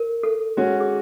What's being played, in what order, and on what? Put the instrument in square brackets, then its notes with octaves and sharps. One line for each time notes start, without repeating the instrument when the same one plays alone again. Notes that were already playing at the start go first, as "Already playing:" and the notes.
Already playing: [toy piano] A#4
A4
[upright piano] G#3 C#4 F#4
[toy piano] G#4